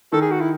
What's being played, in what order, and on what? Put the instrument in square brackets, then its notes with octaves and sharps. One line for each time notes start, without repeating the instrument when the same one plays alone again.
[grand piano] D#3 [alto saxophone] A4
[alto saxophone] G#4
F#4
E4